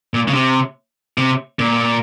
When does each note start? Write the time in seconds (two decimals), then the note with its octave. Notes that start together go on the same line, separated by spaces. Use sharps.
0.14 A#2
0.28 C#3
0.33 C3
1.18 C3
1.59 A#2